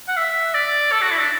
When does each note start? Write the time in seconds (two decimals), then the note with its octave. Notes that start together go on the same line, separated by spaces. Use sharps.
0.08 F#5
0.17 E5
0.55 D5
0.92 A4
1.02 F#4
1.11 E4
1.20 D4